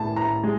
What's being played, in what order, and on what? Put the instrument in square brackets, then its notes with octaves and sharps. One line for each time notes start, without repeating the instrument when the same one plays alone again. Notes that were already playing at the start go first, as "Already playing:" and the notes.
Already playing: [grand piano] A2 [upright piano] A5
[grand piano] A2 [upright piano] A#5
[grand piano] G#3